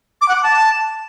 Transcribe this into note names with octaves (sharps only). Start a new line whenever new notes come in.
D6
F#5
D6
A5